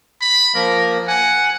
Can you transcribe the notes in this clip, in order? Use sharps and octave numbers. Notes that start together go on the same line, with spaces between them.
B5
F3 A#3 A#4
F#5 G#5